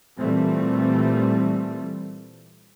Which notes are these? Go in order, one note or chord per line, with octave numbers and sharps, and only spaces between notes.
A#2 E3 G3 A3 C4